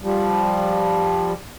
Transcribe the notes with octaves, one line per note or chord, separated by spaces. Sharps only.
F3 G3